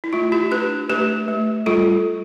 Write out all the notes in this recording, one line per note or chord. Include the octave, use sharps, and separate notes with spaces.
E4
A3 F4
E4 G4
D4 G4 B4
A3 G4 B4
A3
G3 F4 A4